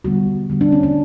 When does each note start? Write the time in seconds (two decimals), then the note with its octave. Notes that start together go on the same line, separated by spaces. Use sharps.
0.04 D3 G3 B3 F#4
0.50 D3 G3 B3
0.61 D4
0.72 C#4
0.83 D4